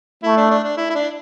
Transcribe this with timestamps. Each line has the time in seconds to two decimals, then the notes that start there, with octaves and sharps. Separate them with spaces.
0.23 A3 E4
0.37 D4
0.50 D4
0.64 D4
0.77 E4
0.90 E4
0.95 D4